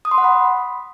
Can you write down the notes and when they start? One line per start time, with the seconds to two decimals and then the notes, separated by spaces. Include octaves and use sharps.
0.05 D#6
0.11 C6
0.18 F#5
0.24 B5